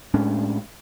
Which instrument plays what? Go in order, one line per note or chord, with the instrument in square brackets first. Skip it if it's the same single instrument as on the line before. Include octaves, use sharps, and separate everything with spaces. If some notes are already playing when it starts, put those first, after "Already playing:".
[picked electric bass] A2 G#3 C#4 D4